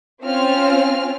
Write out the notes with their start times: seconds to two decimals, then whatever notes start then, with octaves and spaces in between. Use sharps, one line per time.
0.23 C4 C#4 F4 F6